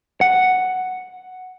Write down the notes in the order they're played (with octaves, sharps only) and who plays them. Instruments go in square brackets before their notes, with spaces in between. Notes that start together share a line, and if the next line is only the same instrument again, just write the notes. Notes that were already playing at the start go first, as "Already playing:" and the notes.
[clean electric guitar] F#5